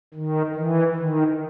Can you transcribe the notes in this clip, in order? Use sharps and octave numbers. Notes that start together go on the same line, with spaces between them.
D#3
E3
D#3